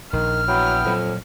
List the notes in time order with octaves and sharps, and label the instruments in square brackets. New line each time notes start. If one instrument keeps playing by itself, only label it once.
[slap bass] A#1 [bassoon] D#3 [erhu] F6
[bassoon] F#3 [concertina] B3 E4 G5
[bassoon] F2 [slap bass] A#2 F#3